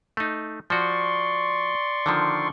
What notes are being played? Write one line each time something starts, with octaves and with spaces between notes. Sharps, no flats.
A3 D#4
F3 F#4 D5 C6 C#6
D3 D#3 F3